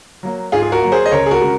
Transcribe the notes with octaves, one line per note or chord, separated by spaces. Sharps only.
F#3 A#3
G#2 F4 G#4
G#4
F#4 A#4
F#3 A#3
G#4 C5
D#5
C#2 A#4 C#5
G#4
F#4 A#4
C#3 G#3